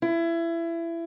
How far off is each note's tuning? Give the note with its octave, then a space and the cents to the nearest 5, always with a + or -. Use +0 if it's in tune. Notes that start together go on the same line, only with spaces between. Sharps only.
E4 +25